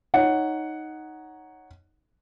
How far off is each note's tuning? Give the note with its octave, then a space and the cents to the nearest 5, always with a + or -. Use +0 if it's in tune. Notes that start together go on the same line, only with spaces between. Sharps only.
D#4 +0 C#5 +0 F#5 +0